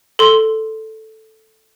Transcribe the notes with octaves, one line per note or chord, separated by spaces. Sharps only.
A4 C6